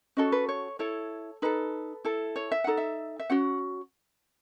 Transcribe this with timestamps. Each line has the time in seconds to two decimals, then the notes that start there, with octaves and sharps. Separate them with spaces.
0.17 C#4 F#4 A4 D#5
0.32 B4
0.49 C#5
0.79 E4 A4 C#5
1.42 D#4 A4 B4
2.05 E4 A4
2.36 C#5
2.52 E5
2.64 D#4 A4 F#5
2.77 E5
3.19 E5
3.30 C#4 F#4 F#5